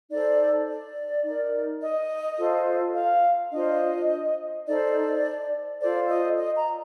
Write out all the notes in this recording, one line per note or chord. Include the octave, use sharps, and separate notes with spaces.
D#4 A4 C5 D5
D5
D#4 A#4
D#5
F4 A4 C5
F5
D4 F4 C5 D#5
D#4 A4 C5 D5
F4 A4 C5 D5
D#5
D#5
A#5